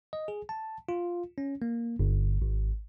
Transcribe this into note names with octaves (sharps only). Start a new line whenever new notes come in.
D#5
G#4
A5
F4
C#4
A#3
G1
G#1